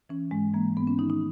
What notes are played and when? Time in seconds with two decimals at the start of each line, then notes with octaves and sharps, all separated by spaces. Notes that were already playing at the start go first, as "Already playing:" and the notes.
0.09 E3 C#4
0.31 G#2 G#3
0.54 E3 A#3
0.77 G#2 B3
0.87 C#4
0.98 D#3 D#4
1.10 D#4